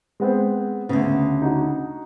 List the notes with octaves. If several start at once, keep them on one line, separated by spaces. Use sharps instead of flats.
G#3 B3 C4
D2 C#3 B3
D#4 F#4